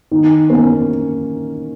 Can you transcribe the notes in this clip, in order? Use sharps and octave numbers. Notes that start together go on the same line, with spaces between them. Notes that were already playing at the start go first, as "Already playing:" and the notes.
D#3
A#3 C#4